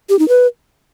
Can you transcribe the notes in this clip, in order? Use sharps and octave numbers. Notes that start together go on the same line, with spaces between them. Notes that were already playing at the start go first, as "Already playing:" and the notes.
G4
D#4
B4